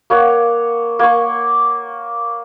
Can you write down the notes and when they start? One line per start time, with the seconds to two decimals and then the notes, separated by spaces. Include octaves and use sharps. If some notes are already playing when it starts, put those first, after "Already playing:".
0.10 A#3 C#5 F#5
0.99 A#3 C#6